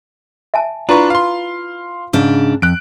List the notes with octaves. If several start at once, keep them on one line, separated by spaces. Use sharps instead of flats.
E5 G#5 A5
D4 E4 F4 B4 A#5 C#6
F5 C6
G#2 C#3 D4
F2 F#6 D7